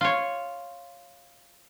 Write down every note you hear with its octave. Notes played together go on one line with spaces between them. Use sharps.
F4 C#5